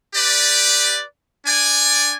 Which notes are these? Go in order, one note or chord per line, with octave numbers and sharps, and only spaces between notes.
G4 B4 D5
D4 D5 G#5